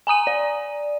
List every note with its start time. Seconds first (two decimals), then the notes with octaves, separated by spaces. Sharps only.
0.07 G#5 A#5 D#6 D#7
0.27 D5